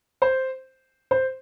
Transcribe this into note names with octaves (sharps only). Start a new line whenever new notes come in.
C5
C5